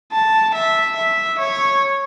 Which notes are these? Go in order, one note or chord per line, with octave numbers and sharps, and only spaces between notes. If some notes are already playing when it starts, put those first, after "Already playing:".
A5
E5
E5
C#5